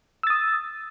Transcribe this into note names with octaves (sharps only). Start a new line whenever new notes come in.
D#6 E6 A6